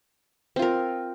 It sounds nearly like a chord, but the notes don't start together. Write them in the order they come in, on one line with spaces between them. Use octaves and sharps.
C4 F4 A#4